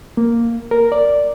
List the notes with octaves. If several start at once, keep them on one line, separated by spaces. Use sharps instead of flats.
A#3
A#4
D5